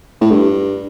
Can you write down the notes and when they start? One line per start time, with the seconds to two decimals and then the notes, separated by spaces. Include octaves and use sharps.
0.21 A2
0.31 G2